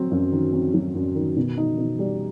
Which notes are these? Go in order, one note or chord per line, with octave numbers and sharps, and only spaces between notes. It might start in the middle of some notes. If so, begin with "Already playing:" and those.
Already playing: F#3 C4
F#2
D#3
C4
F#3
F#2
D#3
B2
D#4
B2
G3